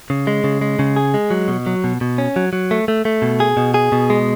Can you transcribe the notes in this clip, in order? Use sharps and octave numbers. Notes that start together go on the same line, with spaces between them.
C#3
G#3
C#3
G#3
C#3
G#4
G#3
F#3
B2
F#3
B2
B2
C#4
F#3
F#3
A3
A3
A3
B2
G#4
B2
G#4
B2
G#3